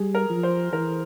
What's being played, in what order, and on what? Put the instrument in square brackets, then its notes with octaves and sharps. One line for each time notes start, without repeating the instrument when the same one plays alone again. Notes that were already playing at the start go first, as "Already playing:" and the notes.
Already playing: [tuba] G3 [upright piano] G#4
[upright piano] A#4
[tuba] F3
[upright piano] C5
[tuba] E3 [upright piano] A#4